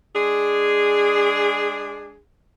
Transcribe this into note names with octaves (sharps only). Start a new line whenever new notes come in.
G#3 D4 G#4